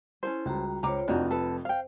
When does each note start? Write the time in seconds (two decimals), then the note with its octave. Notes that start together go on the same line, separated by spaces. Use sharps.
0.23 C#4 E4 A4 C5
0.45 C#2 G3 F#4 A#5
0.83 C#2 F4 C5 C#5 A#5 D6
1.08 F1 F2 D4 D#4 F4 F#4
1.31 A4 B4
1.65 C5 F5 G5